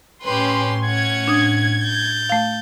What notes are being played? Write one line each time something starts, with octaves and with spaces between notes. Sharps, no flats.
A2 C#4 G4 B4 C6
C#4 F#5 G#6
D4 D#6
G6 A6
A3 F5